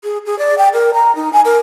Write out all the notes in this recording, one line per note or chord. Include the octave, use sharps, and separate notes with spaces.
G#4
G#4
D5
G5
A#4
A#5
D#4
G#5
A#4